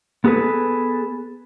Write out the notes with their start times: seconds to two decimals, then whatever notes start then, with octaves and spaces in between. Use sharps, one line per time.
0.25 B3 G#4 A4 B4